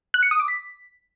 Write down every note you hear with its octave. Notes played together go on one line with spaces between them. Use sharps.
F#6
C#7
D#6
D6
B6